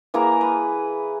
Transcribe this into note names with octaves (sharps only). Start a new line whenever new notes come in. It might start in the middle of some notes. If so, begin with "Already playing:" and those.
E3 A#3 G#4 A#5
B4